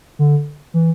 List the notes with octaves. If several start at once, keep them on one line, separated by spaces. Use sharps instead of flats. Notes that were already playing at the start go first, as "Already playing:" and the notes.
D3
E3